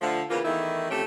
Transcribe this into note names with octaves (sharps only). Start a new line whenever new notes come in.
D3 F3 A3
C#3 E3 A#3 B3 C#4 F4
E2 D#3 E3 A3 D#4 E4
F2 A3 C#4 G4